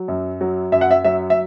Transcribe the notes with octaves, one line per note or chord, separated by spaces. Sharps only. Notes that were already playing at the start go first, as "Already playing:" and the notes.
Already playing: F#3
F#2
F#3
F#2 E5
F#5
E5
F#3 E5
E5